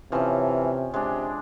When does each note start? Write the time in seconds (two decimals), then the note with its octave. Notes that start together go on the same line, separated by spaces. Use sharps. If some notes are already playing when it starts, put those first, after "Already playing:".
0.12 C3 E3 F3 C#4
0.94 C3 G#3 D4